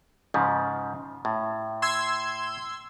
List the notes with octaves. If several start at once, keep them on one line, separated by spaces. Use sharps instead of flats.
G#2 C#3 F3
A2
C6 E6 G#6